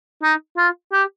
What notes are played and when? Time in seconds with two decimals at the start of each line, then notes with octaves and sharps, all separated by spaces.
0.23 D#4
0.57 F4
0.93 G4